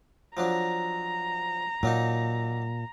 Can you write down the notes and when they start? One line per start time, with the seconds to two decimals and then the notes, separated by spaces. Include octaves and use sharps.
0.37 F3 F#3 D4 A#5
1.83 A#2 F#3 A#3 D#4